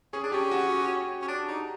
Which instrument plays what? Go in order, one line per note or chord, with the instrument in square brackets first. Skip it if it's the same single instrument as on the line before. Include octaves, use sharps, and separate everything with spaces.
[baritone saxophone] C#4 [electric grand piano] G#4
[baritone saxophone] D4
[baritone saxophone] C#4 [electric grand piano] G4
[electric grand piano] F#4
F#4
[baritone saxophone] C#4
D4
D#4